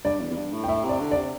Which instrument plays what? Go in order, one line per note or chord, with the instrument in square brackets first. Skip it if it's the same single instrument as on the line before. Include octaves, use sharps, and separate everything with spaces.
[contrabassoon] G2 [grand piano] D5
[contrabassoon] E2
E2
G2
A2
[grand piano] G5
[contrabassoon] A2 [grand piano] E5
[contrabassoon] C3 [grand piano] D5
[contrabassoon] D3
[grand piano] D5
[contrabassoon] C3